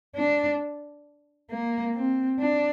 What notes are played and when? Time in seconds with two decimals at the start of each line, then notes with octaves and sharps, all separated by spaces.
0.16 D4
1.51 A#3
1.95 C4
2.40 D4